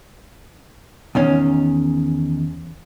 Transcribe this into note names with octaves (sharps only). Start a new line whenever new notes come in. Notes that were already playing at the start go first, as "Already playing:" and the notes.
E2 D#3 C#4